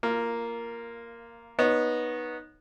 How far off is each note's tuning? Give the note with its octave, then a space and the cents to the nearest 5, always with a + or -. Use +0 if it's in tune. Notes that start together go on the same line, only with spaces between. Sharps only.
A#3 +0 F4 -20
B3 -15 D#4 -5 C#5 -20